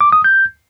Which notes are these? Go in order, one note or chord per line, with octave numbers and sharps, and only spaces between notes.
D6
D#6
G6